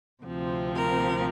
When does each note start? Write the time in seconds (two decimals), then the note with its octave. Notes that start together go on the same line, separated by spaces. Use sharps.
0.24 D2 C3 F3 C4
0.75 A#4